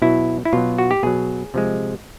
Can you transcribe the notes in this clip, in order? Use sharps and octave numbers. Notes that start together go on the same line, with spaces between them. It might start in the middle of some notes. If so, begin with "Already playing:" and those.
B2 F#3 E4
E4
B2 F#3 F4
F#4
G4
B2 F#3 G#4
C3 F3 G#3